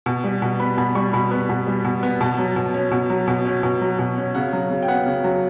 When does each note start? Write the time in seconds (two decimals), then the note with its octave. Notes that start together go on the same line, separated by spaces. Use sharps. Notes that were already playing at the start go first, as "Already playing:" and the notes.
0.06 B2
0.24 G3
0.42 B2
0.59 B3 B5
0.78 B2 B5
0.95 G3 C#6
1.13 B2 B5
1.31 B3
1.49 B2
1.67 G3
1.85 B2
2.03 B3
2.21 B2 A5
2.38 F#3
2.56 B2
2.74 C#4
2.91 B2
3.10 F#3
3.28 B2
3.45 C#4
3.63 B2
3.81 F#3
3.99 B2
4.17 C#4
4.34 C#3 F#5
4.53 F#3
4.71 C#3
4.83 G5
4.88 B3 F#5
5.06 C#3
5.24 F#3